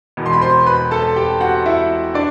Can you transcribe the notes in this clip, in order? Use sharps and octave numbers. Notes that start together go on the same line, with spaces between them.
E1 E2 B2
C6
B5
C5 C6
B4 B5
A4 A5
G4 G5
F#4 F#5
E4 E5
D4 D5